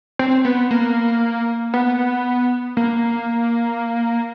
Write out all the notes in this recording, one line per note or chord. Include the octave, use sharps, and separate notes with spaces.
C4
B3
A#3
B3
A#3